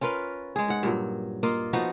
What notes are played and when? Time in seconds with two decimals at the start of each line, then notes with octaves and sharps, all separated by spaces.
0.01 C#4 F4 A#4 B4
0.56 G#3 G#4
0.68 G#2 F#5
0.83 G2 A#2 F#3
1.43 A#3 F4 D#5
1.73 F3 B3 D#4 F#4